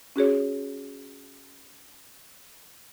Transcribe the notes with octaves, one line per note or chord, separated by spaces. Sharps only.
C#4 F#4 G#4 C#5